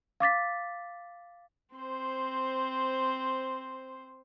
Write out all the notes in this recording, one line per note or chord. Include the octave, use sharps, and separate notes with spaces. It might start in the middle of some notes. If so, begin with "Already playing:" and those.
F5 D6 A6 B6
C4 C5